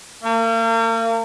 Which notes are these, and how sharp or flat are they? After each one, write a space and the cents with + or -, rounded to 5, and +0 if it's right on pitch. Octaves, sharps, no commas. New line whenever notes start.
A#3 -40